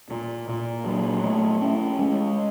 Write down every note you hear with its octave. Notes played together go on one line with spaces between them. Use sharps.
A#2
A#2
F#3
A3
C#4
G#3